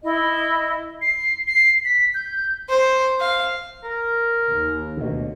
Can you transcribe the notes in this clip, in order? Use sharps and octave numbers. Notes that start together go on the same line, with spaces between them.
E4 D#5
C7
C7
B6
G6
C5
F5
A#4
D#2
D2 B2